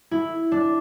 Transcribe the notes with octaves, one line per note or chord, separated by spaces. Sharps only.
E4
D4